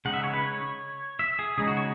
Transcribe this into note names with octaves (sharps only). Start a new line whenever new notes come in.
C#3 G#3 D#4 F#5
E5
C#5
B4
C#5
E5
G#4
C#3 G#3 D#4 G#4
F#4
C#5